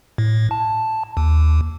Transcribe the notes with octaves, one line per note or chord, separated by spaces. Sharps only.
A2
A5
D#2